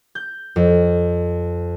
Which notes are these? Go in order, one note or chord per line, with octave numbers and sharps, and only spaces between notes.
G6
F2